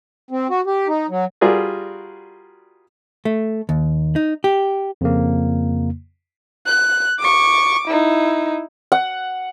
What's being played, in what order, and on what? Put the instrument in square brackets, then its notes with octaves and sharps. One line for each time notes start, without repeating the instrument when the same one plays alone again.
[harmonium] C4
F#4
G4
D#4
F#3
[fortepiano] G3 F4 F#4 G#4 A#4 D5
[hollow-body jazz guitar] A3
D#2
D#4
G4
[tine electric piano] F2 C#3 A#3
[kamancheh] F#6
C#6 D6
D#4 E4
[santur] F#5